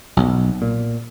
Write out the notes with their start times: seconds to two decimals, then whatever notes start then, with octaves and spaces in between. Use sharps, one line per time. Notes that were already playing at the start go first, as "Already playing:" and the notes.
0.17 B1
0.62 A#2